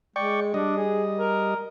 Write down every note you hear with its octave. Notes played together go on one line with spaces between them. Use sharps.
G#3 D5 G5 C#6
G3 D4 D#5
G#4
A#4